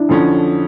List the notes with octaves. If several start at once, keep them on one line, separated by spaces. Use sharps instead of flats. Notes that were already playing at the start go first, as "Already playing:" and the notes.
Already playing: D4 E4
F2 D3 F3 C#4